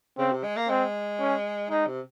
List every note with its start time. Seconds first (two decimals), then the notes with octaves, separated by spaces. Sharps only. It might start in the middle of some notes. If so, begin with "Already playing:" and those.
0.18 C#3 C4
0.32 C3
0.44 G#3
0.57 A#3
0.69 G#3 C4
1.20 C#4
1.70 G#3 D#4
1.86 C3